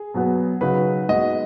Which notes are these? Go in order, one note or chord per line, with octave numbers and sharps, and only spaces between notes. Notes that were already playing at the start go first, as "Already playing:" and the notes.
Already playing: G#4
B2 F#3 B3
C#3 F#3 D#4 F#4 B4
B2 G#3 D#4 F#4 D#5